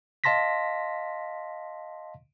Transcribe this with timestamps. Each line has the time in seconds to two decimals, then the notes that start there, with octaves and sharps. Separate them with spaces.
0.24 D#5 F5 A5 C6 A#6 B6